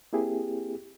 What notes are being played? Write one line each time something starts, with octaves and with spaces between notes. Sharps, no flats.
A#3 C4 E4 G4 G#4